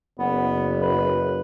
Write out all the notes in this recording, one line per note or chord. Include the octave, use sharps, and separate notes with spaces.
F#1 B3
B4